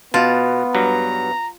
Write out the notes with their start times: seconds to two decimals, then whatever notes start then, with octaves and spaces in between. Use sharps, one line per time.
0.14 B2 B3 F4 A5
0.75 G2 F#3 A#5